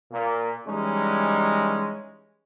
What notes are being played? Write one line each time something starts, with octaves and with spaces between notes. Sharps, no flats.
A#2 A#3
E3 G3 G#3 C#4 D#4